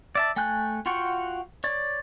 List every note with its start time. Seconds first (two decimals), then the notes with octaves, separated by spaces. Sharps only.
0.15 D5 E5 A5
0.36 A3 G5 G#5 F#6 G6
0.86 F4 F#4 F#5 G5 C#6
1.64 C#5 D5